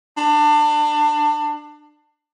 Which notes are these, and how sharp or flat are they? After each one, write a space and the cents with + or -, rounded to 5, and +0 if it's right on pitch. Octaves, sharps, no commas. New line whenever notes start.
D4 +25